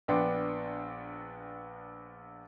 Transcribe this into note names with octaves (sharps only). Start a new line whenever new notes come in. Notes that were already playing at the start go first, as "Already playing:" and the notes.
A#1 B3 D4 G5 C6